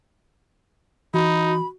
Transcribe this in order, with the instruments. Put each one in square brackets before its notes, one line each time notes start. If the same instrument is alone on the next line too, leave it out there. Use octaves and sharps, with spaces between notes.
[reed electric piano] E3 [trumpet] D#4 [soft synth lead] F#4 [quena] B5